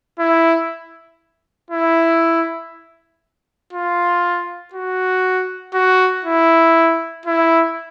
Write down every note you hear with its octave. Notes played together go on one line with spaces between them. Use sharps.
E4
E4
F4
F#4
F#4
E4
E4